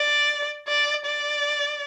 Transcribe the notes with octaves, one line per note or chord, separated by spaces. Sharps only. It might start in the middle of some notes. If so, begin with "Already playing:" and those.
Already playing: D5
D5
D5